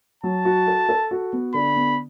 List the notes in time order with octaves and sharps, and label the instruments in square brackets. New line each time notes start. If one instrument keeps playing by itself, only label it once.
[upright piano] F#3 [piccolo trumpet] A5
[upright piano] F#4
A4
A4
F#4
B3
[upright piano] D3 [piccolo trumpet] B5
[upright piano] B3